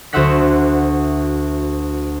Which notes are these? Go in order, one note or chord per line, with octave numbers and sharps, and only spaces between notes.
D2 F#4 C5 E5 F#5 B6